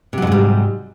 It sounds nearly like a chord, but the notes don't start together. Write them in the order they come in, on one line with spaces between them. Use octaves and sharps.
C3 F#3 F2 G#2 G3